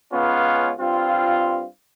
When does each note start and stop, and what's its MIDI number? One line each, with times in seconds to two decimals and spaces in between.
0.12 0.71 37
0.12 0.71 59
0.12 0.71 61
0.12 0.71 65
0.80 1.64 43
0.80 1.64 60
0.80 1.64 65